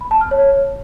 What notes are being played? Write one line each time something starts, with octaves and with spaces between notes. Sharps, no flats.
B5
A5
F6
C#5